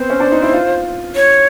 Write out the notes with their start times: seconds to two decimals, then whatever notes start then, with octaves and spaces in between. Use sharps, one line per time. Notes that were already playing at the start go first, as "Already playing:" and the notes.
Already playing: B3 C4 C5
0.10 C#4
0.20 D4
0.32 D#4
0.43 E4
0.53 F4
1.15 C#5